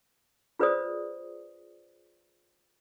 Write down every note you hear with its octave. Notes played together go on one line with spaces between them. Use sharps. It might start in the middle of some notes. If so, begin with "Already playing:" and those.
F4 G#4 B4 C5 D5 D#6